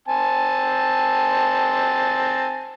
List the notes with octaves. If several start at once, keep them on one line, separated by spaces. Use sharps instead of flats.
C4 G#5 A5